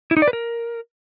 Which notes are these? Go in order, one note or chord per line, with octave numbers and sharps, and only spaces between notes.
E4
D#4
D5
B4
A#4